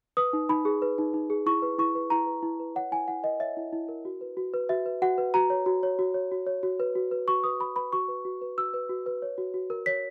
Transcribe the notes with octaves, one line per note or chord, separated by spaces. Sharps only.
B4 D#6
D#4
D#4 B5
G#4
B4
D#4
D#4
G#4
E4 C#6
B4
E4 C#6
B4
E4 A#5
B4
E4
B4
C#5 F#5
E4 G#5
E4 F#5
A#4 D#5
C#5 E5
E4
E4
A#4
F#4
B4
F#4
B4
F#4 E5
B4
F#4 F#5
B4
F#4 A#5
C#5
F#4
C#5
F#4
C#5
F#4
C#5
F#4
B4
F#4
B4
F#4 C#6
B4 D#6
F#4 B5
B4 B5
F#4 C#6
B4
F#4
B4
F#4 E6
B4
F#4
B4
C#5
F#4
F#4
A#4
C#5 B6